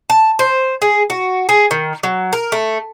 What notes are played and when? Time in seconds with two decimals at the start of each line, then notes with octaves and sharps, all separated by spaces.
0.10 A5
0.39 C5
0.82 G#4
1.10 F#4
1.49 G#4
1.71 D#3
2.03 F#3
2.33 A#4
2.52 A3